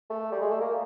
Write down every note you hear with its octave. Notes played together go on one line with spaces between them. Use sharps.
A3
G3
G#3
A3
A#3